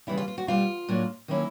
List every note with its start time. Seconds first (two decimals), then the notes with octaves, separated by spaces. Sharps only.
0.07 C#3 E3 G3 E4
0.18 F4
0.28 F4
0.38 F#4
0.47 B2 G3 C4 F4
0.89 A2 F#3 A#3 D4
1.28 D#3 F#3 A#3 C#4 E4